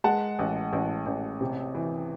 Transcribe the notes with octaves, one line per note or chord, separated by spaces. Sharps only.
G#3 F#5 A5
A1
A1
A1
C3
E3